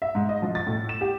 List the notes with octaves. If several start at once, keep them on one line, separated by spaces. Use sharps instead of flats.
E5
G#2
D#5
F3
A6
A2
E7
G4